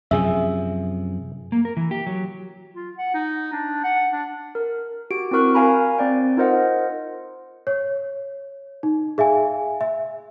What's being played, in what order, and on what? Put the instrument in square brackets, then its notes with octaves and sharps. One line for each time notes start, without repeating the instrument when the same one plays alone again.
[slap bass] F#2 C3 F3 [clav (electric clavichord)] G#4 E5
[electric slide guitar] A#3
A#4
E3
G4
F#3
[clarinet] F4
F#5
D#4
D4
F#5
D4
[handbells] A#4
F#4 G4 D7
C4 E4 F#4 A#4 C#6 F#6
A#4 F5 G#5 A#5 B5
C4 D5 G5
D#4 F4 A#4 C5 D#5 F#5
[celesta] C#5
D#4
G#4 E5 F5 G#5
E5